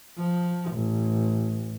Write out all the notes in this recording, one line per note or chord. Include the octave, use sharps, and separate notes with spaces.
F3
A1